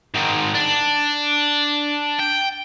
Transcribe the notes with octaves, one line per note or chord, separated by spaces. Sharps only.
G#2 D#3
D4
G5